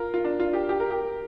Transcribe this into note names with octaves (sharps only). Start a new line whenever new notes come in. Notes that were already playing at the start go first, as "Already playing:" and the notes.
Already playing: F4 A#4
F4
D4
F4
G4
G4
A#4
G4